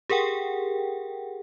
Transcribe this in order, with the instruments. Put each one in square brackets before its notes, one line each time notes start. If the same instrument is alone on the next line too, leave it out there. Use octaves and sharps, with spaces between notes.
[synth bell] G4 G#4 A#4 F#5 G5